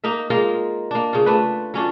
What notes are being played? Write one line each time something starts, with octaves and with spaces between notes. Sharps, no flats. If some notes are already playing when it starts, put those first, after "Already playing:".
A#3 D#4 A#4 E5
G#3 A#3 F4 A#4
A#3 D4
C#3 F4
A3 D4 B4
F#3 C#4 D4 F4